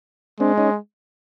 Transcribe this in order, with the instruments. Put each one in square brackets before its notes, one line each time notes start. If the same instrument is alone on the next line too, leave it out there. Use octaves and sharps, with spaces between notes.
[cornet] G#3 [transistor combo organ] C4 D4
[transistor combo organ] C#4 D#4